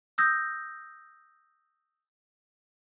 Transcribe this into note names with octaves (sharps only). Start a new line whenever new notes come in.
D#6 E6 G6 A#6